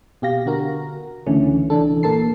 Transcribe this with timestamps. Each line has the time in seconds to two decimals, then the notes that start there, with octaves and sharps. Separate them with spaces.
0.22 B2 G4 F5 A#6
0.46 D3 F#4 A#4
1.26 C#2 D3 E3 A3 C#4
1.70 C2 E3 D4 A4
2.03 A#2 A4 A#4 A5 C7